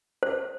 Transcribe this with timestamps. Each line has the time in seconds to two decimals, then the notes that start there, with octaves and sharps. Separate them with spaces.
0.23 C5